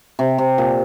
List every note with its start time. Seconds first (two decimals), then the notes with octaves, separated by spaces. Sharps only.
0.19 C3
0.38 C3
0.58 A#2